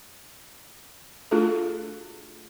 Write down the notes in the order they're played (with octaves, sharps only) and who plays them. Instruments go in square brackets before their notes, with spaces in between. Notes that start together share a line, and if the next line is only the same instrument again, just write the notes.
[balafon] A3 D4 F4 F#4 G#4 A4